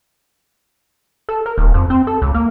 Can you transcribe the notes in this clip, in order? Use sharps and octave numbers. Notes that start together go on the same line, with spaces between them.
A4
A#4
D#1
F2
C4
A4
C#2
A#3